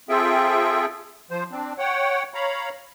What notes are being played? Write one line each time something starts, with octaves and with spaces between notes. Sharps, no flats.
C4 F4 G#4 A4 E5 G5
F3 C5
C4 D4
C#5 F#5 G5
C#5 F5 A#5 B5